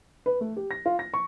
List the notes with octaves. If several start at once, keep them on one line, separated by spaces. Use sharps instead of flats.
B4
A3
G4
A#6
F4
A#6
C#6